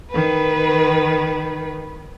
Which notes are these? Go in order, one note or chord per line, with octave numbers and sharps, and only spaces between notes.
D#3 B4